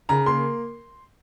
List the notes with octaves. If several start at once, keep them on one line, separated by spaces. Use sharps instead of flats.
C#3 A#5
A#3 C6